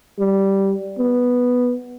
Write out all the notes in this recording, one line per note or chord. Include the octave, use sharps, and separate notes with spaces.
G3
B3